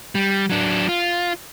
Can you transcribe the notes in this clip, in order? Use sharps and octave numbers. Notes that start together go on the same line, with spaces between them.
G3
F#3 D4
F4